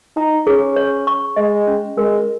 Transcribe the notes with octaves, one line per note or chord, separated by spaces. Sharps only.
D#4 A#5
C#4 G#4
C#5
C#6
G#3 D#5
C#4
G#3 A#4